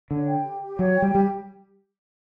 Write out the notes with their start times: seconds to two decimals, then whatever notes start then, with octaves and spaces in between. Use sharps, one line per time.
0.10 D3 C#5
0.28 G5
0.44 G4
0.62 G4
0.79 F#3 C#5
0.96 G5
1.02 G3
1.13 G3 G4